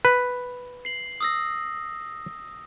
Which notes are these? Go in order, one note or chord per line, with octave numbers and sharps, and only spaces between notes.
B4
C7 F#7
D#6 E6 A#6